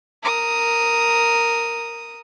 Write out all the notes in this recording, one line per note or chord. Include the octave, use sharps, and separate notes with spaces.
A#4 D#6